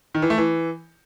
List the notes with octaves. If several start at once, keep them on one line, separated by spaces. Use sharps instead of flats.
D#3
E3
A3
E3